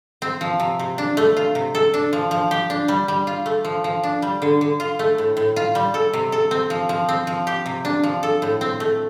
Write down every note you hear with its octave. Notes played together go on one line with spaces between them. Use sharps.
C4
F3
C3
C3
D4
A3
F4
C3
A4
D4
F3
F3
G4
D4
G3
G3
F4
A3
F3
F3
D4
G3
D3
D3
F4
A3
A2
A2
F4
G3
A4
C3
A4
C4
F3
F3
C4
F3
G4
C3
D4
F3
A4
A2
C4
A3